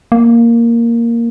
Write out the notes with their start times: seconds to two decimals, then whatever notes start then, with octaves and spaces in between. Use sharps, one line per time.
0.12 A#3